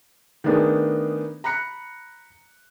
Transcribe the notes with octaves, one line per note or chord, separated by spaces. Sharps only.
D#3 A3 B3 D4 D#4 G#4
A#5 B5 F#6 C#7